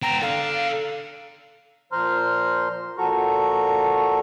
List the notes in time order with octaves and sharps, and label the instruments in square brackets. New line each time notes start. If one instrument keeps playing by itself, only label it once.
[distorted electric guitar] B3 G5 [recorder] A#5
[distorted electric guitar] A4 D5 [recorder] F5
[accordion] A#2 F3 C5 A#5 C6 F6
A#2 F3 F#4 A4 A#5 C#6